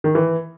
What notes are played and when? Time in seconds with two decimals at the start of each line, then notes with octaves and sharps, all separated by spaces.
0.04 D#3
0.15 E3